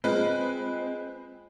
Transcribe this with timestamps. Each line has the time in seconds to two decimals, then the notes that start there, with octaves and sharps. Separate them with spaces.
0.04 G#3 A#3 C4 F4 B4